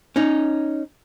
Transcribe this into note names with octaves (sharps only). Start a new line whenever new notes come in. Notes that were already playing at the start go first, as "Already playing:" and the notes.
C#4 D#4